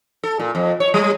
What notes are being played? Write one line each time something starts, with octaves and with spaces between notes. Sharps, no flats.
A4
A#2
F2
C#5
G3